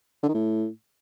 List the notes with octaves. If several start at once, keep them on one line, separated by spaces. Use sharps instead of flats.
D3
D#3
A2